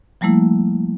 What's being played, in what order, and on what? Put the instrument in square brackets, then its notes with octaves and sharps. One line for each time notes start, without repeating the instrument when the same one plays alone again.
[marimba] F3 G3 A3 A#3 E4